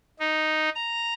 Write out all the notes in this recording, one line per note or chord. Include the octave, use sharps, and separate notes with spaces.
D#4
A#5